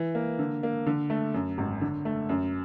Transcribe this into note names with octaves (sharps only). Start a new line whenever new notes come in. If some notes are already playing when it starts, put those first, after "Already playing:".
Already playing: E3
A#3
D3
A#3
D3
A3
F#2
G#1
D3
A3
F#2